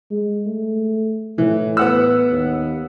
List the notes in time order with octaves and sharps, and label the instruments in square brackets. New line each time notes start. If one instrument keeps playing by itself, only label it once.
[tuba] G#3
A3
[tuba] A2 [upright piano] E3
[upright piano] B3 F#5 E6
[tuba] D#2